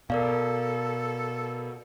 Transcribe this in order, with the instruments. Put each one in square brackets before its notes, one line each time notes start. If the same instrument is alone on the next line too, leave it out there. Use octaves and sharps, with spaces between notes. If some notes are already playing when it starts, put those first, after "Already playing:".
[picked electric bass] B2 [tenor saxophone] A4 [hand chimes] A#4 D5 F5